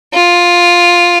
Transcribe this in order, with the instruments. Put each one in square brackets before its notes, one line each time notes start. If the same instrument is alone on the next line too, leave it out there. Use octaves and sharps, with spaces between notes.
[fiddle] F4